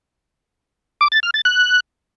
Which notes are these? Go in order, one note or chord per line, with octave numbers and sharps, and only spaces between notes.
D6
A6
F6
A6
F#6